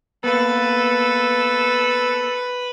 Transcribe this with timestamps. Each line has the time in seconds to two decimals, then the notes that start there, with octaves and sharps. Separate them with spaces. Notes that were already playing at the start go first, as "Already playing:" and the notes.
0.24 A#3 B3 A4 B4